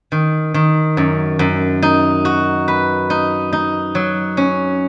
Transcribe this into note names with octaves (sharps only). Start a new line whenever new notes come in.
D#3
D#3
F#2
F#2
D#4
F#4
B4
D#4
D#4
F#3
C#4